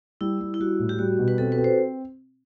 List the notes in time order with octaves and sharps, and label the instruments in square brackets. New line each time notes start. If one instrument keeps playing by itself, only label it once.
[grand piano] G3 [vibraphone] E4
[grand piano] G3
[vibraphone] E4
[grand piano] G3 [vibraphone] F#4
[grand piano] A2
[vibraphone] G4
[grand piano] G3 [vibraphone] F#4
[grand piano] B2
[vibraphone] B4
[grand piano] C4 [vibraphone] A4
[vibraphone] B4
[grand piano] C4
[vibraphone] C5